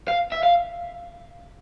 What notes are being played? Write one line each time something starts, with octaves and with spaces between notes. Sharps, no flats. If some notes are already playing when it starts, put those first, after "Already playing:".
F5
E5
F5